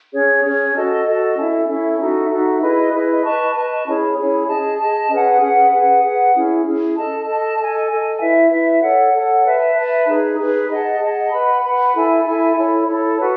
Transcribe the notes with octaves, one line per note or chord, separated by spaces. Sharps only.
C#4 G#4 C#5
C#4 G#4 C#5
F#4 A4 D#5 A5
F#4 A4 D#5 A5
C#4 E4 A4 E5
C#4 E4 A4 E5
D#4 F#4 A4 E5
D#4 F#4 A4 E5
E4 G#4 B4 D#5
E4 G#4 B4 D#5
B4 D#5 A5 C#6
B4 D#5 A5 C#6
C#4 E4 G#4 C#5
C#4 E4 G#4 C#5
G#4 D#5 A5
G#4 D#5 A5
C#4 G#4 B4 F#5
C#4 G#4 B4 F#5
G#4 B4 F#5
G#4 B4 F#5
C#4 E4 G#4
C#4 E4 G#4
A4 D#5 A5
A4 D#5 A5
A4 D#5 G#5
A4 D#5 G#5
E4 B4 E5
E4 B4 E5
A4 C#5 F#5
A4 C#5 F#5
B4 E5 A5
B4 E5 A5
D#4 G#4 B4
D#4 G#4 B4
G#4 D#5 F#5 A5
G#4 D#5 F#5 A5
B4 F#5 B5
B4 F#5 B5
E4 A4 E5 G#5
E4 A4 E5 G#5
E4 A4 C#5
E4 A4 C#5
F#4 B4 F#5 A5